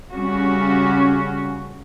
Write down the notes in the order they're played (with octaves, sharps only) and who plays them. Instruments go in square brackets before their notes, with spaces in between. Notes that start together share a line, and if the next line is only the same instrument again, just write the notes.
[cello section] C#3 G3 C#4 F#4